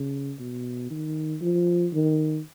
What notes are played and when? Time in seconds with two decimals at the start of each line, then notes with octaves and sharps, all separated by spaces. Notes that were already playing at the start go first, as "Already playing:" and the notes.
Already playing: C#3
0.39 B2
0.90 D#3
1.42 F3
1.93 D#3